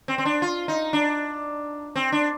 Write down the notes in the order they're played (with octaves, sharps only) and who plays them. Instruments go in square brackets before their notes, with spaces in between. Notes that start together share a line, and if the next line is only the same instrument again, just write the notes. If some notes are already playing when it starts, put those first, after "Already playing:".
[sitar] C4
C4
D4
F4
D#4
D4
C4
D4